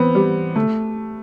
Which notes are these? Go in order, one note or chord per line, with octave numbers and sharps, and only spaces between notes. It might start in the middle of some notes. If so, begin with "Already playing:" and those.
Already playing: E3 B3 C4
G3
D3 A3